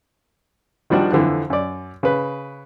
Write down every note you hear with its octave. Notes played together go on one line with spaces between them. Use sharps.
D#3 F3 G3 D4 F#4
F2 D3 E3
F#2 D5
C#3 B4